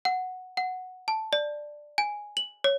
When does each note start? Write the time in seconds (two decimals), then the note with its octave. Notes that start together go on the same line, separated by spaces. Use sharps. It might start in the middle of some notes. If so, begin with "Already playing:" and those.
0.05 F#5
0.57 F#5
1.08 A5
1.33 D5
1.98 G#5
2.37 F#7
2.64 C#5